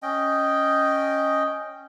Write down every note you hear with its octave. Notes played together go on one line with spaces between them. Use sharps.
C#4 D#5 G5